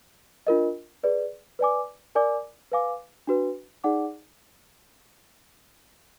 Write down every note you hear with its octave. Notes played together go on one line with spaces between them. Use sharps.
D4 F4 A#4 D#5
G#4 B4 D5
B4 D5 G#5 D6
A#4 D5 G#5 D6
B4 F5 G#5 D6
D4 F#4 B4
D#4 G#4 D5 F#5 D6